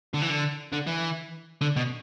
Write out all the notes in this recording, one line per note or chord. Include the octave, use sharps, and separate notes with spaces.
D3
E3
D3
D3
E3
D3
B2